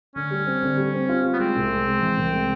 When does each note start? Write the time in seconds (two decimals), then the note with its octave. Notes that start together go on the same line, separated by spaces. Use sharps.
0.16 D3 C#4
0.31 G3
0.47 C4
0.63 D3
0.77 G3
0.94 C4
1.09 F4
1.24 G3
1.33 B3
1.40 G#3 C4
1.56 C2
1.71 G#3
1.86 G#3
2.01 E3
2.17 C2
2.32 G#3